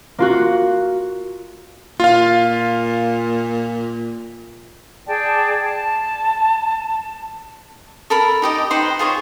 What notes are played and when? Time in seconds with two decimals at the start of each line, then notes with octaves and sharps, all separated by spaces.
0.18 A#3 F4 F#4
2.00 A#2 F4 F5
5.07 G#4 D5 G5 A5
5.62 A5
8.10 A4 A#4 B5
8.42 D#4 G4 D#5
8.70 D#4 B4 C5 G5
8.99 F4 G#4 C5 C#5